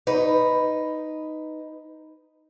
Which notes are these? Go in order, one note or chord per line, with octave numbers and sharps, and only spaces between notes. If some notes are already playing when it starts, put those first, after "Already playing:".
D#4 B4